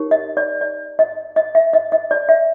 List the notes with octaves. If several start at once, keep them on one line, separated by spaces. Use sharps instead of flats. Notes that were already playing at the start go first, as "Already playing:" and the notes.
Already playing: D#4 G4 A#4 C#5
D#5
D5
D5
D#5
D#5
E5
D#5
D#5
D5
E5